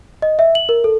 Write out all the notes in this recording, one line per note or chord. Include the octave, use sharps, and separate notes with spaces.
D#5
E5
F#7
A#4
A4